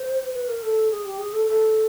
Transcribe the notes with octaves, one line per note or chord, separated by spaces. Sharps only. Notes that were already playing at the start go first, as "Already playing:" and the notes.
Already playing: C5
B4
A#4
A4
G#4
G4
G#4
A4
A4